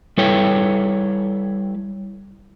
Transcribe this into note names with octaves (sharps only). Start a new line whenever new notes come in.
G3 E4 A4 B4 C#5 G5